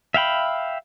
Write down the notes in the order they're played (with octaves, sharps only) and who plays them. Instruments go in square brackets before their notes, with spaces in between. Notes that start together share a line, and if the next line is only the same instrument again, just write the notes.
[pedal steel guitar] E5 F5 G5 B5